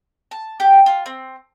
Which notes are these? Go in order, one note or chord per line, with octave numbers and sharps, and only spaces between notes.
A5
G4
F4
C4